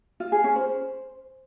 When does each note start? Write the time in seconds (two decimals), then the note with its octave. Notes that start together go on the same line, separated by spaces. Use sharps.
0.20 F4
0.32 G#4
0.44 C#4
0.56 C5